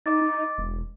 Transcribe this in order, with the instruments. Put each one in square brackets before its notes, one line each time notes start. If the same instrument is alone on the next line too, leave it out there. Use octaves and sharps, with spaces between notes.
[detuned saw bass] D#4 [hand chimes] D#5 D6 A6
[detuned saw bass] D#4
E1